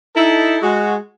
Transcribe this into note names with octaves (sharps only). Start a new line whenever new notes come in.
D#4 E4 A4
G#3 F#4